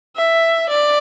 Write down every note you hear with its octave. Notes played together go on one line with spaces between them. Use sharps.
E5
D5